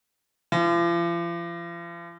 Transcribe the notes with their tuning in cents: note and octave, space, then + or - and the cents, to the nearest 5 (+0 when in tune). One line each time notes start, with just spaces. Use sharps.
F3 -40